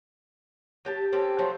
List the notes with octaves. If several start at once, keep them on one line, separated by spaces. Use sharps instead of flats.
F#3 G4 A5
C4 C#4 G4 A4
F3 F#3 A3 C5